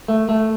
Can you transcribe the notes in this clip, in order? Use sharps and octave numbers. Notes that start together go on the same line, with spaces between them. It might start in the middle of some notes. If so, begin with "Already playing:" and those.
A3
A3